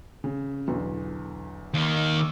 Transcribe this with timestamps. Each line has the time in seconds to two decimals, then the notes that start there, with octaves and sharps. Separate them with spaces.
0.24 C#3
0.68 B1 E2 D3
1.74 D#2 D#3
2.17 C#6 D6 E6